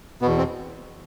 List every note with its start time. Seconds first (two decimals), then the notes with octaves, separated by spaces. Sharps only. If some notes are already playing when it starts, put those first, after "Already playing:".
0.22 B2 B3
0.25 E2
0.38 C4